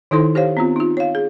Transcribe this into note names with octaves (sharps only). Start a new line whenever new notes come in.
D#3 D#4 E4 A4 C5 C6
G4 C5 C#5 F5
B3 C4 F4
D#4 F4
C#5 F5
G#4